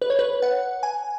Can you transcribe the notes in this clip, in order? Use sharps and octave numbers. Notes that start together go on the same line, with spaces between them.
B4
C#5
B4
F#5
G#5